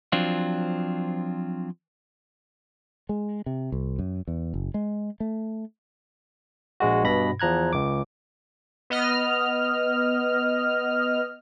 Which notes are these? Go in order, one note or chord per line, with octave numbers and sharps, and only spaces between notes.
F3 F#3 C4 D4 F4
G#3
C3
C2
F#2
E2
F#1
G#3
A3
A#1 G#3 F#4
G2 B2 B5 A#6
E2 F3 A#5 F#6 G#6
C#2 D6
B3 D#5 F6